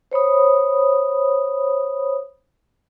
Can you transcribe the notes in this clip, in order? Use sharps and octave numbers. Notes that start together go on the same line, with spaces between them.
C5 C#5 B5 D#6